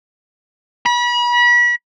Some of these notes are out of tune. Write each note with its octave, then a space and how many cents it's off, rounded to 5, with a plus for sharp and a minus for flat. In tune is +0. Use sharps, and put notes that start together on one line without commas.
B5 -35